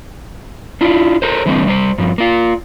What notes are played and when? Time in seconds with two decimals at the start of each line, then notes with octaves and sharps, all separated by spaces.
0.81 D4 E4 F4
1.22 A4 A#4 C5
1.46 D3 E3 G3 A3 C4
1.68 G3 C5
1.98 G2 F3
2.18 A#3 F4